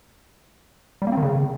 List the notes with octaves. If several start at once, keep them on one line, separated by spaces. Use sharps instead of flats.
G3
A#3
C4
D#3
C#3